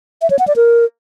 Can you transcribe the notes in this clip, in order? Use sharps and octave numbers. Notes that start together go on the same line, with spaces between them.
E5
C#5
F#5
D5
A#4